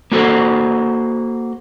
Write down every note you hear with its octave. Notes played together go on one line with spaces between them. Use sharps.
A#3 F#4 A4 C5